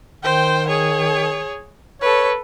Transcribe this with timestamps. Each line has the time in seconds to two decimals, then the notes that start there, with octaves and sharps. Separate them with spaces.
0.23 D#3 C5 G5
0.68 G#4 C#5
2.01 A4 B4 C#5